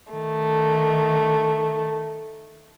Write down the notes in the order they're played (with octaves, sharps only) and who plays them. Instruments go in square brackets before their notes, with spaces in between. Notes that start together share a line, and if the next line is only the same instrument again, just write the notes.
[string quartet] D#3 A3